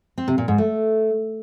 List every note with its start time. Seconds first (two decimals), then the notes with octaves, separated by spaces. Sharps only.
0.18 C4
0.28 C3
0.38 A#2
0.48 G#2
0.58 A3